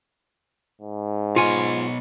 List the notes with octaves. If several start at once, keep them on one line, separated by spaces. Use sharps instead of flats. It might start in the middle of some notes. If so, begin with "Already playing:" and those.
G#2
B2 F4 C#5 G#5